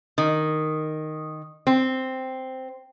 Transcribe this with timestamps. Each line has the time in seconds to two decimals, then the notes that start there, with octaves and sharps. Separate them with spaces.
0.18 D#3
1.67 C4